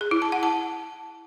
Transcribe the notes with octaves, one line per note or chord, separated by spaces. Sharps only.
G#4
E4
A5
F#5
A5